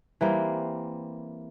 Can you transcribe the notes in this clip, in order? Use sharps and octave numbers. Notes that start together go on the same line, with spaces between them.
E3 G3 A#3 C4